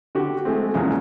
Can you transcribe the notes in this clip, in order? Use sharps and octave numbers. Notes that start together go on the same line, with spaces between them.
D3 F#4 G4
G#3 A3 C4
E2 A#2 C#3 G#3